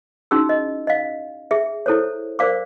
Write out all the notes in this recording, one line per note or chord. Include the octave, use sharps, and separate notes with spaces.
C#4 D#4 E4 F#4 G#4 E6
D#5
D#5 F5
G#4 E5
E4 A4 C5 C#5
A#4 C5 D5 F5 D6